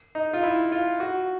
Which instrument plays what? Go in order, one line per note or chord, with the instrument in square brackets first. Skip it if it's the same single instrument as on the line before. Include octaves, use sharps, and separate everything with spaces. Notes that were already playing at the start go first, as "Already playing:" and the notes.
[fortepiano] D#4
F4
E4
F4
F#4